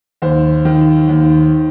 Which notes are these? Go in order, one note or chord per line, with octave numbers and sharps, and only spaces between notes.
D#2 C5
D#3
D#2